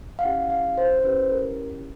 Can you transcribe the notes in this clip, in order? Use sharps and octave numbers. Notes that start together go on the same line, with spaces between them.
F5
C#4 E4 G4 F#5
F5
C5
C5
C#4 E4 G4 B4
A#4